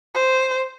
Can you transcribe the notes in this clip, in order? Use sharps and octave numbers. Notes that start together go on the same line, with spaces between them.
C5